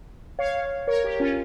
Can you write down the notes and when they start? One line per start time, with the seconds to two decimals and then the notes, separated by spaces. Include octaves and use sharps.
0.39 C#5 F5
0.87 A#4 C#5
1.03 G4 A#4
1.20 C#4 F4